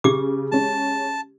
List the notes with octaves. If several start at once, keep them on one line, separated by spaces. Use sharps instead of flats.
C#3 G4 D6
G#3 C#4 A5